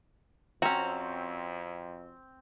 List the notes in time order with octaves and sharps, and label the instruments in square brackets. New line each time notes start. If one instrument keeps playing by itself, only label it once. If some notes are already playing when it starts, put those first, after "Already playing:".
[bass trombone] F2 [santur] C4 [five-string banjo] C#4 F#4 [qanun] A#5